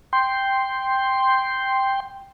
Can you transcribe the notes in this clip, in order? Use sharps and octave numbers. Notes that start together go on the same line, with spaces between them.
G5 C6